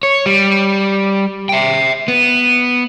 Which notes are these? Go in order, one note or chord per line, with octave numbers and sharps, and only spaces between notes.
C#5
G3
E5 G5
B3